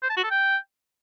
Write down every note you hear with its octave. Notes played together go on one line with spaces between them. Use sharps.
C5
A5
F#4
A4
G5